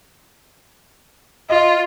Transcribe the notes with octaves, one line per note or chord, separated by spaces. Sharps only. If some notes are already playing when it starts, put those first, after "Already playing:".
F4 D#5